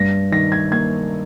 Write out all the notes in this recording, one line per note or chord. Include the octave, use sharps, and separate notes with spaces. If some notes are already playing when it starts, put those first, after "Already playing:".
Already playing: G2 A#6
D#3 A#6
G#6
A#3 G#6